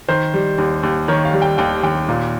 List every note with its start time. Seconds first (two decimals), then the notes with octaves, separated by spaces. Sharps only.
0.09 D#3 C5
0.34 G3
0.58 D#2
0.83 D#2
1.08 D#3 C#5
1.25 F5
1.33 G3
1.42 G5
1.58 D#2 G5
1.83 D#2 G5
2.09 A#2